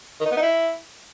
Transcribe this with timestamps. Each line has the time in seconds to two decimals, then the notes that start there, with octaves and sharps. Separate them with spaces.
0.20 D#3
0.26 D#4
0.31 B3
0.37 D#4
0.42 E4